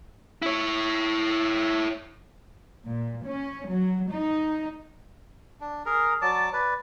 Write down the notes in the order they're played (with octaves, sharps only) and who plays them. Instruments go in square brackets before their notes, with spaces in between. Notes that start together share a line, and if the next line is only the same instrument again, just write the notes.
[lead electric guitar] E4 C#5
[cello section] A#2
C#4
F#3
D#4
[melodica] D4
G#4 A#4 A#5
F#3 D5 A5 D6
B4 D5